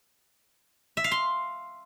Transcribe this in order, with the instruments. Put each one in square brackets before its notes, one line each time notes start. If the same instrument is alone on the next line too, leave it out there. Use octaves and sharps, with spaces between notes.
[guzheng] E5
F5
C6